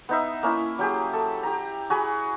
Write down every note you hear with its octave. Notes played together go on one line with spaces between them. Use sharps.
B3 D#4 E5
A#3 C#4 E4
F#3 G4 G#4
A4
G4 A#5
F#4 G#4 G#5 B5